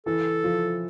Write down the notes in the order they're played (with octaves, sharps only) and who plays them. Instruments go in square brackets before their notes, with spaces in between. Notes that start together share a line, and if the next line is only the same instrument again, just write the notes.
[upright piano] E3 [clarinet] A4
[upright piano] F3